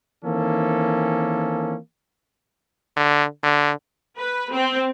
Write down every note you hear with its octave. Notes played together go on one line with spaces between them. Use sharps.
D#3 E3 A#3 C4 C#4 A4
D3
D3
B4
C4